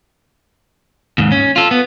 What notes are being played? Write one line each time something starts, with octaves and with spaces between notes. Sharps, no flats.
D#2 G#2
C#4
F4 A4
B3